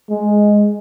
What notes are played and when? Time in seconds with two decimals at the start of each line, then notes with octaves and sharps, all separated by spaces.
0.10 G#3